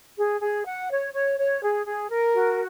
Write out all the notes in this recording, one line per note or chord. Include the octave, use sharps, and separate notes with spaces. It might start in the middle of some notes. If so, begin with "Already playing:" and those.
G#4
G#4
F#5
C#5
C#5
C#5
G#4
G#4
A#4
F#4